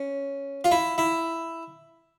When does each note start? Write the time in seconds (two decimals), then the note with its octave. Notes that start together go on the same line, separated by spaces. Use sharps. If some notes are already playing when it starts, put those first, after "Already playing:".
Already playing: C#4
0.64 F4
0.71 E4
0.98 E4